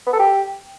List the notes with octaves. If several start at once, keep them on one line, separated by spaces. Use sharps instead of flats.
B3
A4
G4